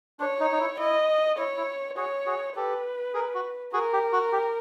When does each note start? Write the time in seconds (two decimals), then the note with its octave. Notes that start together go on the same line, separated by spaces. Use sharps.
0.20 D4 C#5
0.40 D#4
0.52 D#4
0.60 E4
0.78 E4 D#5
1.38 E4 C#5
1.57 E4
1.97 F#4 G#4 C#5
2.26 F#4 G#4
2.56 G4 A4 B4
3.14 G#4 A#4
3.35 F#4
3.73 F#4 G#4 A#4
3.93 G4
4.13 F#4
4.32 G4